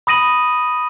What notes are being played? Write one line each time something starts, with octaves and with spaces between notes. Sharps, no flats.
B5 D#6 A#6 D#7 F#7